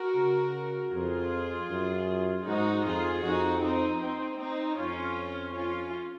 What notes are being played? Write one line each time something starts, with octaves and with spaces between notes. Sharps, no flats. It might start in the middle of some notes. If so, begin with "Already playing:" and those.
Already playing: F#4 A#4
C#3
F2 F4 G#4
F#2
G#2 D#4 F#4
F2 F4 G#4
F2 D#4 F#4
C4 D#4
C4 D#4
C4 D#4
F2 C#4 F4
C#4 F4